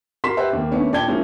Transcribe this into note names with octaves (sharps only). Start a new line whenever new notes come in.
F#4 A#4 C6 B6 E7
G4 B4 C5 D#5 E5 F#5
D#2 A#3
D#3 A3 B3 C#4 D4
A#1 D5 G5 A5 G#6 G7
F3 G#3 A#3 C#4 D#4 E4